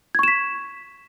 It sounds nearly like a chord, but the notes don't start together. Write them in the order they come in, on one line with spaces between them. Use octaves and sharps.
G#6 C#6 E7 B6